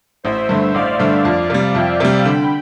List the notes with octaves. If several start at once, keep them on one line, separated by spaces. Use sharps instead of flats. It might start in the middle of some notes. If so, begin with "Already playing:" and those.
A1 C5 E5
G2 D3 A3
A1 D5 F5
G2 D3 A3
F2
C3 G3
F2 E5 G5
C3 G3
D3 G5 B5